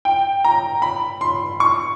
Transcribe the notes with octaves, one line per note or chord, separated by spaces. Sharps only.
G5
A#5
B5
C6
C#6